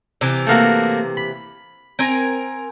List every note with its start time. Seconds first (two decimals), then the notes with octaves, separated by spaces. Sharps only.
0.21 C3 E3 G4
0.47 A3 A#3 F#4
1.17 B5
1.99 C4 A#4 G#5